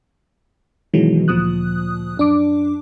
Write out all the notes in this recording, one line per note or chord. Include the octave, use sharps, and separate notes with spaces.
B2 D#3 E3 F#3 G#3
D2 A#2 F3 D#6 F#6
F#2 D4 D6